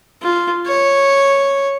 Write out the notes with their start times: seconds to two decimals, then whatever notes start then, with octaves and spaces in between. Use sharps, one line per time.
0.22 F4
0.66 C#5